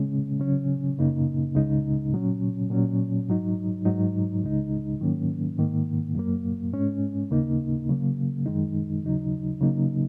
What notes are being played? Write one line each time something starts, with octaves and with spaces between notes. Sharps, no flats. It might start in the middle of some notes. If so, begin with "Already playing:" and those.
Already playing: C#3 G#3 C#4
C#3 F#3 C#4
F#2 C#3 A#3 D#4
C#2 C#3 G#3 D#4
A#2 F#3 C#4
A#2 F#3 C#4
G#2 F#3 D#4
G#2 F#3 D#4
C#2 C#3 G#3 D#4
G#2 D#3 F#3 A#3 C#4
G#2 D#3 A#3
F#2 F#3 A#3
G#2 G#3 C#4
D#2 C#3 A#3 D#4
C#3 F#3 A#3
F#2 D#3 G#3 D#4
D#2 C#3 F#3 D#4
C#3 F#3 A#3 D#4